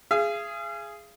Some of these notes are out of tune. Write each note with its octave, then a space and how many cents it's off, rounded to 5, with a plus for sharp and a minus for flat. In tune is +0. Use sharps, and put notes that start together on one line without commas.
G#4 +0 F5 -40